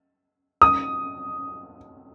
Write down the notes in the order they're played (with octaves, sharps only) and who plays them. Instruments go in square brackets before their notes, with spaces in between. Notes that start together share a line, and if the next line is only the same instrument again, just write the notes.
[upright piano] D#6